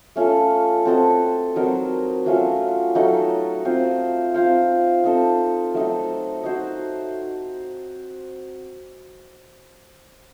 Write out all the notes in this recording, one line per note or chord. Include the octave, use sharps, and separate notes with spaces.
A3 C#4 F4 A4
C4 F#4 A4 D#5
F#3 C4 D#4 A#4
F#3 A3 C#4 F4
F#3 A3 D#4 A4
C4 F4 C5
C4 F4 C5 F5
C4 D#4 A4
F#3 A3 D#4
D#4 F#4 C5